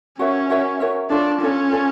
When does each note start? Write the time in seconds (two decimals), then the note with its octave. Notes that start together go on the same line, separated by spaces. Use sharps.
0.19 C#4 F#4 A#4 C#5 E5
0.50 F#4 A#4 C#5 E5
0.80 F#4 A#4 C#5 E5
1.10 D4 F4 A4 C#5
1.41 C#4 F4 A4 C#5
1.72 F4 A4 C#5